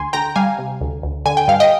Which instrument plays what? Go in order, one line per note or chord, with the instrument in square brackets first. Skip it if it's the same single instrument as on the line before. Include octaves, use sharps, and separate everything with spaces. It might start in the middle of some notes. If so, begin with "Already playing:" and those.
Already playing: [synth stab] D2 G#5 C6
D2 G5 A#5
G3 F5 G#5
C3
D2
D2
D3 G#5
G5
G2 F5
D#5 G5